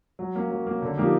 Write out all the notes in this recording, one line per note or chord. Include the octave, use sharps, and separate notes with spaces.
F#3
A#3 C#4
F#3
A#3 C#4
D3
F3 A#3 D#4 G4